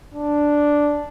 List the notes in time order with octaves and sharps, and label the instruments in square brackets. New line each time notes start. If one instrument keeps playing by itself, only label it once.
[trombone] D4